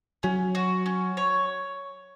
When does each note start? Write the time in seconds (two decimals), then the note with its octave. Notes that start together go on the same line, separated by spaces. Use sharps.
0.23 F#3 C#4
0.55 F#4
0.86 C#4
1.17 C#5